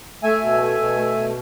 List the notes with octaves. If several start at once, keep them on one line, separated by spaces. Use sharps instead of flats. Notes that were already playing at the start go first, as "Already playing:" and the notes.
A3 E5 G#5
B2
A3
B2
A3
B2